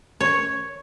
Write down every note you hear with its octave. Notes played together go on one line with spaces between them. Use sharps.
C#5